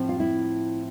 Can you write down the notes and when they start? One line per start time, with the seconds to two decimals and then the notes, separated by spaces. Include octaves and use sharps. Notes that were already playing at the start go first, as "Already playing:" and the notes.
Already playing: A2 F3 C4
0.09 F4
0.20 E4